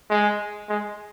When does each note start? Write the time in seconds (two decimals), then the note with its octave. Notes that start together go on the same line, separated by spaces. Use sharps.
0.10 G#3
0.69 G#3